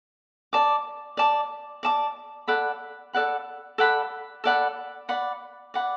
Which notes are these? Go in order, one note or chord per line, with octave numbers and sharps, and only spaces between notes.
D5 A5 D6
D5 A5 D6
D5 A5 D6
A4 D5 F#5 B5
A4 D5 F#5 B5
A4 D5 F#5 B5
A4 D5 F#5 B5
D5 F#5 B5
D5 F#5 B5